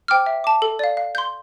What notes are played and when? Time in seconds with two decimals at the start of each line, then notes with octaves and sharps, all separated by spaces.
0.08 C5 G5 D6 F6
0.26 E5
0.44 A5 D6
0.62 A4
0.79 D5 F5
0.97 F5
1.15 C6 G6